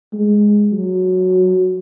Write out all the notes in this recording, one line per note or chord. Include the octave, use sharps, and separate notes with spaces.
G#3
F#3